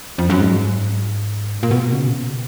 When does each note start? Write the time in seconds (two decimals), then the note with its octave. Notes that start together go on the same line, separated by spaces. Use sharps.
0.18 F2
0.30 F#2
0.40 G#2
1.63 A#2
1.71 B2
1.92 C#3
2.07 A#2
2.14 B2